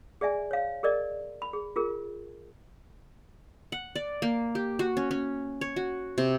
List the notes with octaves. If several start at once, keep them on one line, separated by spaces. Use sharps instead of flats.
G#4 D5 E5 G#5
C#5 F5
G#4 A#4 D5 D#5
B5
G#4
F4 G#4 A#4
F#5
D5
A#3
G4
F#4
C#4
C#4
C#5
F#4
C3